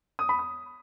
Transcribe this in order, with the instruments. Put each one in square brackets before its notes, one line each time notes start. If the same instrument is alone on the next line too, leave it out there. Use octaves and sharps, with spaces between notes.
[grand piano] D#6
B5
D#6